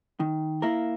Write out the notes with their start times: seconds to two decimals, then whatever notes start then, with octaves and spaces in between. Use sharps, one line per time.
0.20 D#3
0.62 A#3 E4 A#4